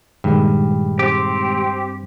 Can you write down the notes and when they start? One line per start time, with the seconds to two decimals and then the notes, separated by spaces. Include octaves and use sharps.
0.24 G2 A#2 D#3 G#3
0.99 C4 G4